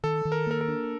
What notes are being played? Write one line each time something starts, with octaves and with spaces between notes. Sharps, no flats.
D#3 A4
D#3
A#4
A#3 A#4
A#4
D4